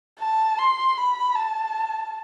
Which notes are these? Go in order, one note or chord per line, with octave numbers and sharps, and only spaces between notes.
A5
C6
B5
A5